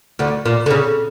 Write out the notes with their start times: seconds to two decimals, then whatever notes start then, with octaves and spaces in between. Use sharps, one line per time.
0.19 D2 D3
0.46 A#2
0.66 D3
0.71 C#3